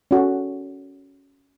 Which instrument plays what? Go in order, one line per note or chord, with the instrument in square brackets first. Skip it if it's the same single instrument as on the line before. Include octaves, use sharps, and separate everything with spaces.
[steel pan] C#4 F#4 A4